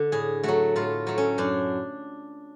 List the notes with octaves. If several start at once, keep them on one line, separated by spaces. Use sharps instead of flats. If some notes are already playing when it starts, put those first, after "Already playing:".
Already playing: D3
A2 G#4
F#3 A3 F#4
A2 F4
F#3 A3
C#4
F#2 D4